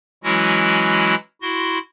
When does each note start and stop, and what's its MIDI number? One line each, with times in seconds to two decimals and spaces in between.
0.24 1.15 52
0.24 1.15 54
0.24 1.15 56
0.24 1.15 61
0.24 1.15 64
0.24 1.15 66
1.42 1.78 64
1.42 1.78 66
1.42 1.78 84